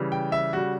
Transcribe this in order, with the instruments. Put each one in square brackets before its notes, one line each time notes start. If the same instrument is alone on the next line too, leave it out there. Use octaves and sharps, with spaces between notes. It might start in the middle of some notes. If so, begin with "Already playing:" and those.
Already playing: [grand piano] C#3 E3 G3
G5
E5
C#3 G3 F#4